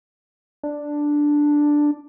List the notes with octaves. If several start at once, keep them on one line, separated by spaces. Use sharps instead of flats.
D4